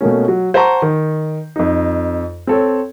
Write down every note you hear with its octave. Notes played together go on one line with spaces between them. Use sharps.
B2 A3 A#3 C#4
F#3
C5 F#5 A5 A#5 C#6
D#3
F2 D#4
C4 A4 C#5